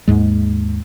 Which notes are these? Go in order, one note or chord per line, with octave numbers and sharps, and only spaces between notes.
D#2 G#2 G#3